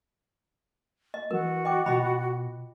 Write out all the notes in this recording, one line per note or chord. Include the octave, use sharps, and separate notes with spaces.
D#5
E3 F#4 A#4
D#5 G5 D6
B2 F4 D#5 B5